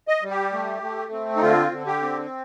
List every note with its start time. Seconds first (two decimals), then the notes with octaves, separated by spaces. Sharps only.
0.08 D#5
0.23 G3
0.30 G4
0.53 A3
0.82 A3
1.12 C4
1.36 D#4
1.42 D3 F4
1.72 D3
1.87 G4
2.02 C4